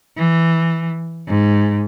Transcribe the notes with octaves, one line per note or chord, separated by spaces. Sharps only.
E3
G#2